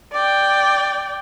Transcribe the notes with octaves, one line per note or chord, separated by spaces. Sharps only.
D5 G5